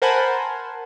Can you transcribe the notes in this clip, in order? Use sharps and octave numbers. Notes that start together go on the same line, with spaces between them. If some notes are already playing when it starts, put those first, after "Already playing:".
A#4 C5 F#5 G#5 A5 B5